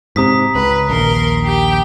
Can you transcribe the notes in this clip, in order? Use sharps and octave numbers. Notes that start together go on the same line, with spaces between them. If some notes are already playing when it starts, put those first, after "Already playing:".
G#2 C3 A#5 D#6 B6
C#2 B4
A#1 D#2 A#4 C6
G4 G5